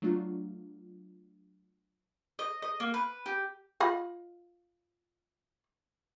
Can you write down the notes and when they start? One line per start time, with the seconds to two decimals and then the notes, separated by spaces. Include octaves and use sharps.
0.02 F#3 A3 D4 F4
2.39 D#5
2.62 D#5
2.80 A#3
2.94 B4
3.26 G4
3.80 F4 D#5 B5